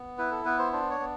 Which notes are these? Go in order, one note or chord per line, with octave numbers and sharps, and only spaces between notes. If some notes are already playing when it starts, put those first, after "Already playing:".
Already playing: B3
E4 B4
A4
B3 B4
C5
D4 C5
C#5
B3